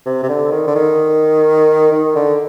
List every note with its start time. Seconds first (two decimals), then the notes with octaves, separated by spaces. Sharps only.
0.06 C3
0.23 C3
0.29 D3
0.52 D#3
0.67 D3
0.76 D#3
1.92 D#3
2.16 D3